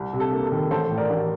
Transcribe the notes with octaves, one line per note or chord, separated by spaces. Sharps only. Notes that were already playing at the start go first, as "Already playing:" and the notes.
Already playing: C2
C3
A4
A#3
A4
D#3
A1 A4 C5
A2
A#4 D5
A1